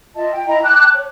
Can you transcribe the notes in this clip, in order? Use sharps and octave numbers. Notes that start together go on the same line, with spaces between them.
F4 D#5 E5 A5
G5
E4 D#5 E5 A#5
G5 A5 D6 F#6
C#5